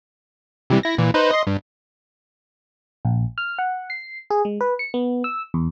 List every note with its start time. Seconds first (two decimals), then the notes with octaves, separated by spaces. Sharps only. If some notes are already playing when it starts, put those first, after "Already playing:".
0.70 C3 E3 G3
0.83 E4 A#6
0.98 A#2 E3
1.14 D#4 B4 C5
1.30 D#5 C6
1.47 G2
3.05 A#1
3.38 F6
3.58 F#5
3.90 C7
4.30 G#4
4.45 G#3
4.61 B4
4.79 C#7
4.94 B3
5.24 E6
5.54 E2